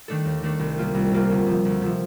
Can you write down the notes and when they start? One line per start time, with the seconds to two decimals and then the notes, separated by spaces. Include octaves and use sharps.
0.08 D#3 A3 D4 A4
0.25 D#2
0.42 D#3 A3 D4 A4
0.59 C2
0.78 C3 G3 A#3 F4
0.95 C2
1.12 C3 G3 A#3 F4
1.30 D2
1.47 C3 F3
1.65 D2
1.82 C3 F3